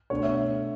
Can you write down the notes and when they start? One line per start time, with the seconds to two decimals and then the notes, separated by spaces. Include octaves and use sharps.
0.10 B2 A3 D4 C#5
0.23 E5